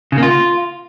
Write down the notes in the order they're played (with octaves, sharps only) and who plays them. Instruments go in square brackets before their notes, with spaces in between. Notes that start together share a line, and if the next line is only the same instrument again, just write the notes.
[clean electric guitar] C#3
A#3
F4